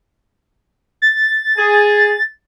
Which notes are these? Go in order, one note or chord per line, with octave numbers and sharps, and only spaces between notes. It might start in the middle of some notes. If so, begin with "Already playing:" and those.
A6
G#4